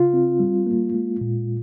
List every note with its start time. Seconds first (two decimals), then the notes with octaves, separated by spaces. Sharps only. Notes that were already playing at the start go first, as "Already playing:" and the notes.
Already playing: C#3 F4
0.13 C4
0.40 G3
0.67 A#3
0.94 G#3
1.21 A#2